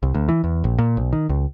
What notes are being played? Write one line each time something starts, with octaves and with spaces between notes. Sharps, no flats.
C2
D2
E3
E2
A#1
A#2
B1
D#3
C#2